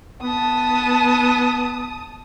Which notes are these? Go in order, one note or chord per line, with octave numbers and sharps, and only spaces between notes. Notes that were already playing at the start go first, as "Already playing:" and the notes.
B3 A5 D#6